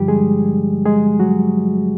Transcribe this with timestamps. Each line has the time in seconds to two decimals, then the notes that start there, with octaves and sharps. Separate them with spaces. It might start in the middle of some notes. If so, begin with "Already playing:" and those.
Already playing: G2 D3 F3 G3 G4
0.08 G#3 G#4
0.86 G#3 G#4
1.19 F#3 F#4